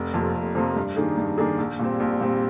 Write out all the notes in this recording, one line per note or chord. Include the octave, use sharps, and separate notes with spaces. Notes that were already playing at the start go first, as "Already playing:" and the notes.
Already playing: F1
F2 C3 F3 A#3
F1
F2 C3 F3 A#3
G2
D#3 A#3 D4 G#4
G2
D#3 A#3 D4 G#4
A#1
A#2 G3 C4
A#1
A#2 G3 C4